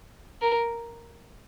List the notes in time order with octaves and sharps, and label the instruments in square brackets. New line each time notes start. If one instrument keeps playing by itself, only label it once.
[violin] A#4